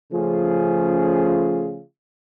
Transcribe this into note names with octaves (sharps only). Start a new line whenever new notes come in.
C#3 F3 A3 C#4 F4 G#4